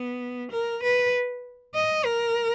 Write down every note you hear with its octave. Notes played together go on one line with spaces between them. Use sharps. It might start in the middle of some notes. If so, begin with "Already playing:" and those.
Already playing: B3
A#4
B4
D#5
A#4